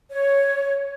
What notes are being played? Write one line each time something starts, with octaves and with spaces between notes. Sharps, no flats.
C#5